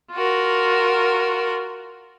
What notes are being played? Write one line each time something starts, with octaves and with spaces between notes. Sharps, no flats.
F4 F#4 A#4